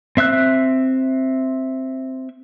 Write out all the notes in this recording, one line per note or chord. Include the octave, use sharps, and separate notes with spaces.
C4 E5 E6 F#6